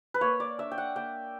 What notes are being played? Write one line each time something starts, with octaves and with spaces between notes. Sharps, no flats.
B4
A#3 C#5
D5
D4 E5
G5
F#5
A#3 G5